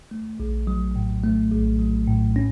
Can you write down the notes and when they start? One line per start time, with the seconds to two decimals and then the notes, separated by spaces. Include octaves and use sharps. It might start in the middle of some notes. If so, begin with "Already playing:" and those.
0.11 A3
0.40 A#1
0.67 F#3
0.96 A2
1.24 A3
1.52 A#1
1.79 F#3
2.08 A2
2.36 C#4